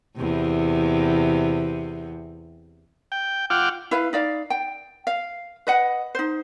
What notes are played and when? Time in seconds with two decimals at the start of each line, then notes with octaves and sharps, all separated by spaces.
0.17 E2 C3
3.12 G5
3.50 F4 F#5 G5 D6 F6
3.91 E4 B4 F5
4.13 D#4 D5 F5
4.50 G5
5.07 F5
5.67 B4 D#5 F#5
6.15 D#4 C5